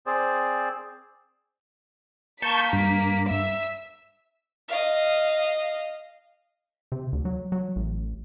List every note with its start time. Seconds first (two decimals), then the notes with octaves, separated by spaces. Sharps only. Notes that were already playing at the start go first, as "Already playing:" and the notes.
0.06 C4 G#4 C5 D5
2.42 A#3 A5 C#6 G6 B6
2.73 G2
3.28 E5 E6
4.68 D#5 F5
6.92 C3
7.13 D2
7.25 F#3
7.52 F#3
7.76 A1